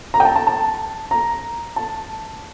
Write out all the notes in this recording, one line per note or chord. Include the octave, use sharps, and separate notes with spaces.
A#5
G5
A5
A5
A5
A#5
A5